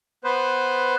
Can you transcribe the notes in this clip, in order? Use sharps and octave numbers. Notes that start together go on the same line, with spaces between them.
B3 B4 C5